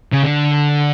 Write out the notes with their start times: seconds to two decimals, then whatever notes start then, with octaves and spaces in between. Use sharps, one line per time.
0.12 C#3
0.23 D3